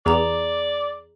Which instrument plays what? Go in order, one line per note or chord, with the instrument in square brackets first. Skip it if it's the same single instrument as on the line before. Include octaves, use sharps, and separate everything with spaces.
[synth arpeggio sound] E2 [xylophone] G#4 A#5 F7 [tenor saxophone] D5